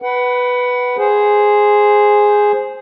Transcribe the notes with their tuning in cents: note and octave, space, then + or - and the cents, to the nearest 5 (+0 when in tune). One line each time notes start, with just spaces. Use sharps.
B4 +0 F#5 +25
G#4 +0 C5 +0